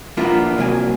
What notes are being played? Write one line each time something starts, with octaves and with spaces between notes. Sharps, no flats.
F3 A#3 B3 D4 E4 F4
C2 F#3 A#3 D5 G#5